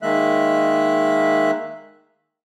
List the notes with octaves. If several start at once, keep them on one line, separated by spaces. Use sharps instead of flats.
D#3 G#3 A#3 E5 F#6